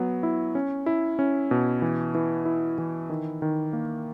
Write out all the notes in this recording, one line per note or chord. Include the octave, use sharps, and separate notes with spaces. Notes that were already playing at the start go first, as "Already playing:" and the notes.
Already playing: F#3 B3
E4
C#4
E4
C#4
B2
E3
E3
E4
E3
D#3
D#3
A#3